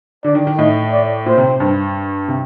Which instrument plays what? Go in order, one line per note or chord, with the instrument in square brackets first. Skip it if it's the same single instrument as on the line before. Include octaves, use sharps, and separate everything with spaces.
[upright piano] D3 [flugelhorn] D5
[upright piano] D#3
D#3
[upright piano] A2 [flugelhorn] D#5
[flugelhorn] D5
[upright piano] A#2 [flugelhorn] C5
[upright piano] C3
G2
C3